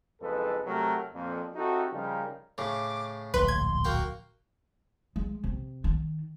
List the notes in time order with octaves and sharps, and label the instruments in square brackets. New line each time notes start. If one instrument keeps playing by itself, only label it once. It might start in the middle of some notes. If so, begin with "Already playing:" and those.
[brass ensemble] F#1 F2 G#3 A4 B4
C3 F#3 A3 F#4 G4 A#4
F2 A#2
C4 D#4 E4 F#4 G4 A4
C#3 F3 G3 D#4 A#4
[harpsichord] A2 C#3 [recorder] D6
[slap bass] D1 A#1 [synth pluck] B4 [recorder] C6
[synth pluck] G#6
[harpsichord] A#3 F#4 G5
[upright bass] G#3
C3
D#3